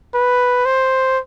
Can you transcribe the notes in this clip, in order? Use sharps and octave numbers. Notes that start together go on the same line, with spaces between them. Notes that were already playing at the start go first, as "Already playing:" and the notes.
B4
C5